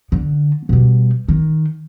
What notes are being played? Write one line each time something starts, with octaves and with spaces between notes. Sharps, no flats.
D3
B2 G3
D#3